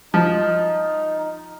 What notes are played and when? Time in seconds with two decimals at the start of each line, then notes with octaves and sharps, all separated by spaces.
0.14 F3 D#4